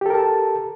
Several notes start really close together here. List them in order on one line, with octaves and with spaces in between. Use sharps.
G4 A4 A#4 A5